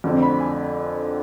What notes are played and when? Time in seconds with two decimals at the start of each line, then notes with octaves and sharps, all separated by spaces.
0.04 F2 D3 A3 C4
0.22 B5
0.40 G#5